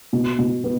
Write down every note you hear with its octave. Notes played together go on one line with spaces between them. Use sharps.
B2
B2
B3